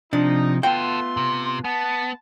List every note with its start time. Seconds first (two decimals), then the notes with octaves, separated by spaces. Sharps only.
0.13 C3 F3 D4 D#4
0.63 A3 B3 F4 F#4 A4 G5 C6
1.17 C3
1.64 B3 A5